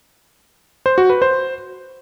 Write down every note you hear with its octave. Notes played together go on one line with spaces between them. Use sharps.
C5
F#4
B4
C5